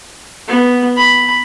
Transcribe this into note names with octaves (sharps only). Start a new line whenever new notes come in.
B3
B5